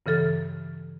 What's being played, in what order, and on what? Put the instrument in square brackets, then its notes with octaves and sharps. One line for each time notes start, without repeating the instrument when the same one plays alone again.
[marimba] G2 C#3 E3 A4 F6